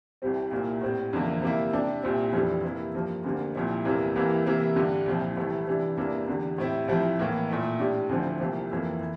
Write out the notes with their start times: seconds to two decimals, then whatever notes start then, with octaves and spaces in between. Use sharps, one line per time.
0.22 C2 C3 G3 C4
0.51 C2 A#2 G3 A#3 E4
0.81 A2 G3 C4
1.13 E2 D3 F3 A#3 E4
1.42 C3 G3 A#3 E4
1.73 C3 G3 D4
2.03 C2 A#2 G3 C4 E4
2.33 F2 E3 G3 D4
2.63 C3 E3 A#3 E4
2.95 G2 F3 A#3
3.24 D2 D3 G3 A#3
3.55 C2 A#2 F3 C4 E4
3.85 E2 C3 E3 A#3
4.16 C2 C3 E3 A#3
4.46 C3 E3 A#3 E4
4.76 G2 D3 G3
5.06 C2 A#2 F3 C4 E4
5.36 C2 C3 E3 A3 E4
5.67 C3 E3 G3 D4
5.97 E2 C3 E3 A#3 D4
6.28 E2 D3 G3
6.58 A2 G3 C4 E4
6.88 C2 C3 F3 C4 E4
7.19 A2 E3 A#3
7.49 A#2 A3 E4
7.79 A2 G3 D4
8.09 D2 D3 F3 C4 E4
8.40 C2 C3 F3 A#3
8.70 F2 E3 A#3 E4
9.01 E3